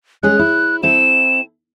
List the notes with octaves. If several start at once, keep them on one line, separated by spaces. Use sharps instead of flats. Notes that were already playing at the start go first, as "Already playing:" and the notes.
G#3 C#4 G#4 F#6
E4
C4 E4 A4 E7